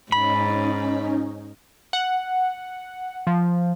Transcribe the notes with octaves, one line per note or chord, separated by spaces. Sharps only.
G#2 C#4 D#4 B5
F#5
F3